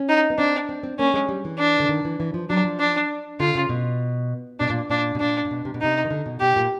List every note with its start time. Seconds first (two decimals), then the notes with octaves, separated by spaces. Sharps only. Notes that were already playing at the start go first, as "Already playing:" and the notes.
Already playing: C#4
0.09 D#4
0.30 B3
0.38 C4 D4
0.69 C4
0.83 C4
0.99 A#3 C#4
1.14 G#3
1.29 G3
1.45 E3
1.59 D4
1.80 D3
1.89 D#3
2.05 E3
2.20 E3
2.34 F3
2.50 F#3 D4
2.65 F3
2.80 D4
3.40 D3 F4
3.55 C#3
3.69 B2
4.60 B2 D4
4.70 A#2
4.90 A#2 D4
5.15 B2
5.20 A#2 D4
5.45 A#2
5.51 B2
5.65 C3
5.74 B2
5.81 C3 D#4
6.05 D#3
6.11 D3
6.26 B2
6.40 B2 G4
6.56 A#2